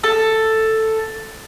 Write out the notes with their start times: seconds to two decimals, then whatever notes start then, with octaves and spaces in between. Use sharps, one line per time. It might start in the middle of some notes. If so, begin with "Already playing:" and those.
0.04 A4